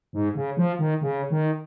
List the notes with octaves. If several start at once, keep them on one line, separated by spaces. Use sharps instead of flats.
G#2
C#3
F3
D#3
C#3
D#3